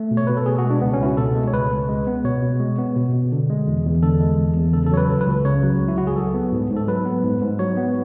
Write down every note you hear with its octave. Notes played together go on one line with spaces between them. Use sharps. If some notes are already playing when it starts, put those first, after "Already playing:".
Already playing: A3
B2
C#5
B2 B4
A4
B2 G#4
F#4
G#3
D4
C#2 B3
C#4
C#2 E4
F#4
B2 A4
G#3
C#5
C#2 B4
C#2
G#3
B3
B2 C#5
B2
G#3
B3
B2
B2
D3
G#3
E2
E2
D3 A4
G#3
E2
E2
C#3 A4
A4
F#3 C#5
B4
C#2 A4
B4
C#2
C#3 C#5
F#3
C#2
E4
C#2 F#4
G#4
F#3 A4
B3
G#2
G#2
A4
F#3 B4
B3
G#2
G#2
F#3 C#5
B3